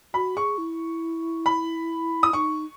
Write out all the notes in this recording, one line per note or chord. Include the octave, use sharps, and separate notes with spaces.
F#4 B5
G#4 C#6
E4
B5
D#6
D#4 C#6